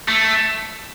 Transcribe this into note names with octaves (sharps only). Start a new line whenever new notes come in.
A3